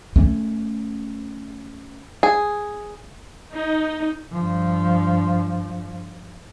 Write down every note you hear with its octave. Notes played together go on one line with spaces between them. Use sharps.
A3 C#4
G#4
D#4
G2 F3